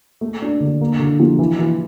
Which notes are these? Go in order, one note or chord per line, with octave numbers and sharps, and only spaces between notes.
A3
D4
D3
A#3
D3
F3
E3
E3